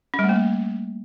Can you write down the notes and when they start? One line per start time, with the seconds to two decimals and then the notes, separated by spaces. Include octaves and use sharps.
0.14 C#4
0.19 G3
0.24 A3
0.29 A#3